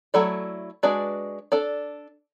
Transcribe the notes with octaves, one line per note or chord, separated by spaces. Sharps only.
F#3 A3 E4 A4 D5
G#3 D4 F#4 B4 D5
D4 A4 D5